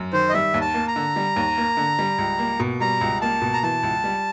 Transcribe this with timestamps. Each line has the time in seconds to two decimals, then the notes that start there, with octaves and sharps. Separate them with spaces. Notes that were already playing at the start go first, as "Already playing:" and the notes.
Already playing: F#2
0.13 D#3 C5
0.29 D#5
0.34 G3 E5
0.54 D#2
0.61 A5
0.74 A#3
0.88 A#5
0.96 D3
1.16 G3
1.36 D#2
1.58 A#3
1.77 D3
1.99 G3
2.18 C#2
2.39 A#3
2.60 B2
2.81 G3 A#5
3.01 C#2
3.21 A#3 A5
3.42 B2
3.53 A#5
3.63 E3 A5
3.83 C#2
4.04 G3